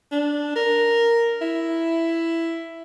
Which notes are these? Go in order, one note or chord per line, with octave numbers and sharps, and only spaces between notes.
D4
A#4
E4